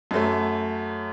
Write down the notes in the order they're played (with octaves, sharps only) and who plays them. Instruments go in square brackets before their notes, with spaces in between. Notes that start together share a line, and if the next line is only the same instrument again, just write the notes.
[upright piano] F#2 F#3 A3